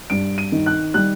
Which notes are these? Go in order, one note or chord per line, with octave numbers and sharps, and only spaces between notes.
G2 D7
D#7
D#3
F#6
G3 F#6